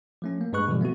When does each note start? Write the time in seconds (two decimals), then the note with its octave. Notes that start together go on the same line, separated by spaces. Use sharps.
0.22 F3 A3 C#4
0.41 A#3
0.53 G2 G#3 B4 C#6 F#6
0.68 B2 D3 E3 F3 G3 G#3
0.81 A3 B3 C4 F#4